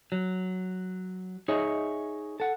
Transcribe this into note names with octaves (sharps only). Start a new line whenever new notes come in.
F#3
D#4 G#4 C#5 D#5 E5
A4 F#5